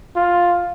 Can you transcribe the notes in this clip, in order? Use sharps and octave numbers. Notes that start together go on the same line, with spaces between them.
F4